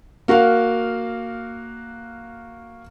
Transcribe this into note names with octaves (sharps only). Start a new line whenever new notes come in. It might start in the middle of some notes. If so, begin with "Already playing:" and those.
A#3 F#4 A#4 F5